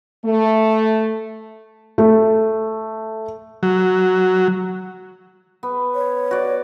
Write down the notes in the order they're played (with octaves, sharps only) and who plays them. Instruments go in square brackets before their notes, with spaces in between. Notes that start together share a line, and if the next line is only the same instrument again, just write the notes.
[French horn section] A3
[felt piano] A3
[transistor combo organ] F#3
[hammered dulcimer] B3
[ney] C#5
[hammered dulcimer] F#4 D5